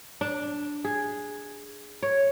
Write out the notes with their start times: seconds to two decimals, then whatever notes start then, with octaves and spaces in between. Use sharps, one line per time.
0.21 D4
0.85 G#4
2.03 C#5